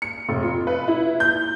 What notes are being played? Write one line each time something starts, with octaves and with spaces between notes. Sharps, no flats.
C#7
F1
F4
B4
E4
G6